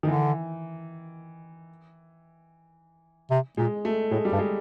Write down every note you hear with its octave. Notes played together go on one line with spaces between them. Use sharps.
D#3
D3 E3
C3
A#2 G#3
A3
A2 G#3
G3
G2
G#3